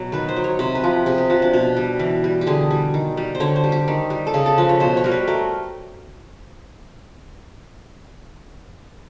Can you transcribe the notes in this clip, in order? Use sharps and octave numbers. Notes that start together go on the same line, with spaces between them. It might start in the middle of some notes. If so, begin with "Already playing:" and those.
Already playing: B2 F#3
D#3 B4
C5
F#3
C#5
C3 C5
B4
F3
C3 G#4
G4
F3 F#4
D4
B2 F#4
G3
E3
G3
G4
D3 G#4
G3
D#3
G3
C5
D3 C#5
C5
G3
G4
D#3
G3
A4
C#3 G#4
A4
F3 B4
C#5
B2 C5
C#5
G3 A#4
B4
A3 A#4